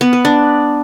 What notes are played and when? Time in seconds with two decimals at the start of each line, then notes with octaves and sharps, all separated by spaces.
0.01 B3
0.13 B4
0.25 D4